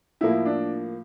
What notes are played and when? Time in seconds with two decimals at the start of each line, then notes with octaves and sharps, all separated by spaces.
0.21 A2 F3 A#3 E4
0.46 D4